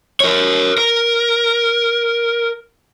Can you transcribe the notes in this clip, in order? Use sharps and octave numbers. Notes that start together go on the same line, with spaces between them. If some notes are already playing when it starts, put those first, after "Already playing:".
A#4 C#5
A#4